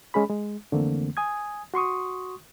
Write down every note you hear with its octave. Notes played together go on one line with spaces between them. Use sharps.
G#3 C#4 G#4 B5
G#3
F2 D3 E3 A3 A#3 C4
G#5 D#6 G#6
F#4 C6 C#6 D#6